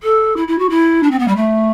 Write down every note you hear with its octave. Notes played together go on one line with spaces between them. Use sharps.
A4
E4
E4
F#4
E4
D4
C4
B3
G3
A3